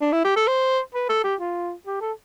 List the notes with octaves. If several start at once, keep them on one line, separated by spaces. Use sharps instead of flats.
D4
E4
G4
A4
C5
B4
A4
G4
F4
G4
A4